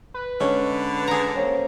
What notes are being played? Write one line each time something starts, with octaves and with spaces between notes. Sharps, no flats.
B4
D3 G#3 C#4
G#4 A#5
A#3 C4 C#4